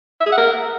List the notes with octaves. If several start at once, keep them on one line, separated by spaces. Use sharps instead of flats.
E5
G#4
F#5
A#4